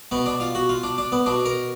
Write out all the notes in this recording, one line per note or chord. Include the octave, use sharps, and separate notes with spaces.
B2 B3
D4
F4
F#4
F4
D4
D4
B3
B2 D4
A#4